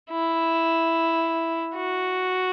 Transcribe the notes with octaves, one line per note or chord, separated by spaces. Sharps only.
E4
F#4